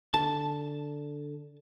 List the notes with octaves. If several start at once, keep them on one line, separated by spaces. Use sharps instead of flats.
D3 A5